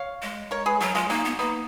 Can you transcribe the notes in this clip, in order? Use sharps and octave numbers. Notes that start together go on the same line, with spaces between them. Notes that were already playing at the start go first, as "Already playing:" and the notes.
Already playing: C#5 F5
G#3
A#4 C#5
G#4 B4
F#3 F#4 A#4
G#3 F4 G#4
A#3 D#4 F#4
B3
A#3 B3 D#4